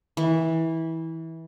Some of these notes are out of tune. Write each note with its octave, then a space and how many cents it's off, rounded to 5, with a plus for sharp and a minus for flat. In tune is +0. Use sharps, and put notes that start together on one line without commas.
E3 -20